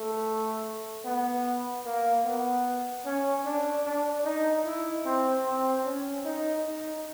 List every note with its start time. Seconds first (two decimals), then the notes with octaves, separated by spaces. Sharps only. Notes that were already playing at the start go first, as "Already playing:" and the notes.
Already playing: A3
1.05 B3
1.86 A#3
2.25 B3
3.05 C#4
3.45 D4
3.85 D4
4.25 D#4
4.65 E4
5.05 C4
5.45 C4
5.85 C#4
6.25 D#4
6.65 D#4